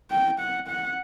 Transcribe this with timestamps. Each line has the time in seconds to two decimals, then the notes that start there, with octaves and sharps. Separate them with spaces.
0.11 G5
0.40 F#5
0.68 F#5